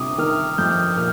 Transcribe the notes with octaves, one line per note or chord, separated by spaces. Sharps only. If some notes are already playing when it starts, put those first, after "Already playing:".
Already playing: G1 C3 D6 D#6
D#3 F6
F2 G6
A#2 F6